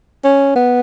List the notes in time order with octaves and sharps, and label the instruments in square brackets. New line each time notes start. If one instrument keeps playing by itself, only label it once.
[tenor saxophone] C#4
B3